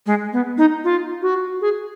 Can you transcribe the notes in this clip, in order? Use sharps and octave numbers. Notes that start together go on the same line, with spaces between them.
G#3
B3
D#4
F4
F#4
G#4